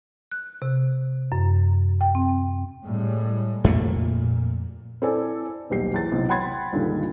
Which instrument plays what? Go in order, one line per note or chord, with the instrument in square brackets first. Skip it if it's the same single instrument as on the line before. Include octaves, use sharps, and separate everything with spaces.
[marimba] F#6
C3
F#2
G5
C4
[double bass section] A2 G3 G#3
[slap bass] F2 A3 A#3 [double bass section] A#2
[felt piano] C4 E4 A4 D5 G#5
D#1 B1 G4 C7
E2 A6
B1 A2 C3
F#5 G5 B5 C6 G#6 A6
C#2 G2 A#2 D3 D#3 G3